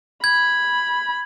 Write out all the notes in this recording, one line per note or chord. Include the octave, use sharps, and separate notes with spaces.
B5 G#6